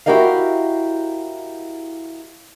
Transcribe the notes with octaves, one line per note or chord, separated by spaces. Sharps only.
E4 F#4 G4 A#4 D#5 F5